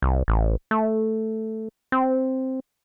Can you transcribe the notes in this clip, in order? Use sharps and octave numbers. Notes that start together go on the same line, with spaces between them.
C2
A1
A3
C4